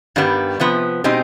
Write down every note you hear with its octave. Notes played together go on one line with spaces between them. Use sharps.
G2 D#3 G3 B3
C3 F3 B3
B2 G#3 C4 D#4 G4